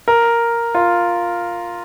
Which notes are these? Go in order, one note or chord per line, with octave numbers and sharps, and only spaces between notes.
A#4
F4